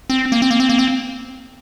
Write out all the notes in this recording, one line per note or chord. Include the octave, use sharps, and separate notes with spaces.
C4
A#3
C4
A#3
C4
A#3
C4